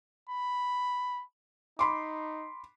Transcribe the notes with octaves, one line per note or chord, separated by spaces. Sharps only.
B5
D#4 B5 C6 D6